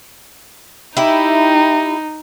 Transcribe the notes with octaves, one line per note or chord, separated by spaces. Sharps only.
D#4 E4 G4